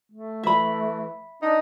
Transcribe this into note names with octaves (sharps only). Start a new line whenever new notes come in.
A3
E3 E5 B5
D4 D#4